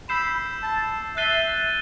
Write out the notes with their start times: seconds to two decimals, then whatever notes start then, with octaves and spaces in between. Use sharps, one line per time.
0.09 B5 E6 G6 C7 E7
0.63 A5
1.17 E5 F#6 A6 C7 D#7 G7